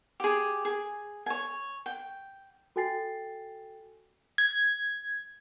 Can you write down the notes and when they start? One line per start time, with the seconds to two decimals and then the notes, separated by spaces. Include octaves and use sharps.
0.20 G4 G#4
0.65 G#4
1.26 C#5 G#5
1.86 G5
2.76 F#4 A4 G5 G#5 A6 C7
4.38 G#6